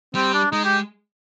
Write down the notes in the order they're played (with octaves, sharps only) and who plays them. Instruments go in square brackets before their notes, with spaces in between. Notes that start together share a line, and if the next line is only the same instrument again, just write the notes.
[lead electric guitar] G3 [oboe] C4
[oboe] D4
[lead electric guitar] G#3 [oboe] D#4
[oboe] G4